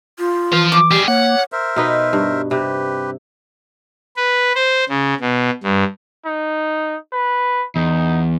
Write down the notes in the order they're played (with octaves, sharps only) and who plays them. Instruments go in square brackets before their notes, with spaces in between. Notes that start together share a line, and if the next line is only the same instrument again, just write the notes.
[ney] F4
[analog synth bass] E3 [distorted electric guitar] F3 F5
[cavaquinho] D6
[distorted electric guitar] G3 G#4 [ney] G4
[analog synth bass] A#3 [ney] C#5 [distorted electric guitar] F#5
[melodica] A#4 C5 E5
[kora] B2 D#4 B4
G2
[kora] C3 [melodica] G4 B4
[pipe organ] B4
C5
C#3
B2
G2
[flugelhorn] D#4
B4
[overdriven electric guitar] E2 [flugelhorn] D#4